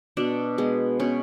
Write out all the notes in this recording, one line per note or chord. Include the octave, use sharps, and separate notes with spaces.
B2 D4
G#3 B3
B2 C#4